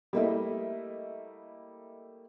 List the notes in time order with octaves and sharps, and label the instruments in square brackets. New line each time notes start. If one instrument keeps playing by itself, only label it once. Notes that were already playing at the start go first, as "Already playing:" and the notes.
[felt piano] G3 A3 A#3 E4 D#5 E5